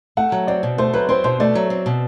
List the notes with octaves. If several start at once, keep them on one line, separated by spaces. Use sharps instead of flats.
A3 F#5
F#3
C4 D5
B2
A3 C5
F#3 B4
C4 C5
B2 C5
A3 D5
F#3
C4
B2